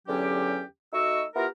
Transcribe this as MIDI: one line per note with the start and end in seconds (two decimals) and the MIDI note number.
0.08 0.62 40
0.08 0.62 50
0.08 0.62 54
0.08 0.62 61
0.08 0.62 67
0.93 1.23 57
0.93 1.23 63
0.93 1.23 66
0.93 1.23 75
0.93 1.23 85
0.93 1.23 88
1.35 1.47 59
1.35 1.47 64
1.35 1.47 65
1.35 1.47 67
1.35 1.47 70